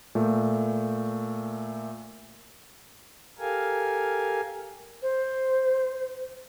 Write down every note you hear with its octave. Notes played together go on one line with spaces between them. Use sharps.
A#2 A3
G4 A4 A#4 F5 G#5
C5